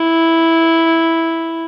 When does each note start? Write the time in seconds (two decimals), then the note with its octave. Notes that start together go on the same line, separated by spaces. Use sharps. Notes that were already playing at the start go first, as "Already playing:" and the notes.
Already playing: E4